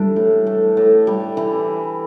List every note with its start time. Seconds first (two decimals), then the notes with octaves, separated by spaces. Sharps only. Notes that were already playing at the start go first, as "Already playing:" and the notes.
Already playing: E3 G3 A3 D4
0.16 A2
0.47 A3
0.77 A2
1.07 G3
1.37 E3